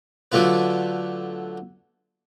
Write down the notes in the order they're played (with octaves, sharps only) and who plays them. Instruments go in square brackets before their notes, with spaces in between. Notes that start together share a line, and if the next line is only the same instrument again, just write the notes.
[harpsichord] D3 F#3 A3 F4 B4